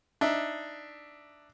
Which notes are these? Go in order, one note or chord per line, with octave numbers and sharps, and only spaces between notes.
D4 D#4 E5